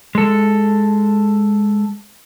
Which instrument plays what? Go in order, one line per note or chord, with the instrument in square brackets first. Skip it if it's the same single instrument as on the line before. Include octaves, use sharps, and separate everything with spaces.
[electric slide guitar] G#3 A4